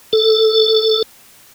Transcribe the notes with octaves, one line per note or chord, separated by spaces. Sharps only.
A4